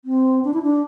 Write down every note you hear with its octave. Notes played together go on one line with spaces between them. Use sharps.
C4
D4
E4
D4